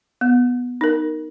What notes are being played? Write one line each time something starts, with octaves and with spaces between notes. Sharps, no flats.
B3
D#4 A#4